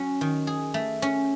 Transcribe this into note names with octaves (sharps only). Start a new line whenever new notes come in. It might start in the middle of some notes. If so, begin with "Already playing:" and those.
Already playing: F#3 C#4
D#3
G#4
A3
C#4